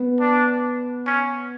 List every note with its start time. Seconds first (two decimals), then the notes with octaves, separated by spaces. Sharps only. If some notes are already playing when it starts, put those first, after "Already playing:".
Already playing: B3
0.20 D4
1.07 C#4